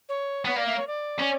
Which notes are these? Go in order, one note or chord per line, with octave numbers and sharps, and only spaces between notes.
C#5
B3 C#5
A#3 D5
E5
C#5
D5
C#4